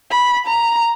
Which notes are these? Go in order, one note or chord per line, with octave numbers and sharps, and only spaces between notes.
B5
A#5